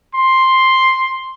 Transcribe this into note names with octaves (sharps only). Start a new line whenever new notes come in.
C6